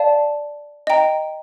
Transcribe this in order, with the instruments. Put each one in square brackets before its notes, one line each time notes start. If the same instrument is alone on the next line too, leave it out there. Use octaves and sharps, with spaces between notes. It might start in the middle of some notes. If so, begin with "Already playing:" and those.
Already playing: [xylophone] D5 F5 A5
D#5 G5 A#5